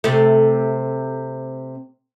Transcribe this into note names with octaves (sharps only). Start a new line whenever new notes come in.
C3 A3